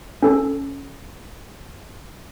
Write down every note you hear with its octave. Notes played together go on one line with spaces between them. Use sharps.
C#4 A4